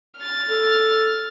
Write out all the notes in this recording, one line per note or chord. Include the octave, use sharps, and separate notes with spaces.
F6 A6
A4